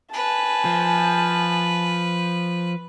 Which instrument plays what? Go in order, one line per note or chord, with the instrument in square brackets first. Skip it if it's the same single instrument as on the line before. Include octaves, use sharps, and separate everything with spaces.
[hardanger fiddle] B4 [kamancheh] G#5 A5
[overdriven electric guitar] F3